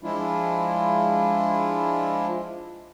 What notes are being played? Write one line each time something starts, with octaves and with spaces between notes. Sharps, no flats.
F3 G#3 D4 E4 F4